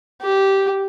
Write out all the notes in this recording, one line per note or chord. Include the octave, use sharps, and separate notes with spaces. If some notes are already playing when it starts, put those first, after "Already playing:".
G4